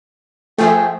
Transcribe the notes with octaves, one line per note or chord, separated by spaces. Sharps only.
F3 A3 G#4 G5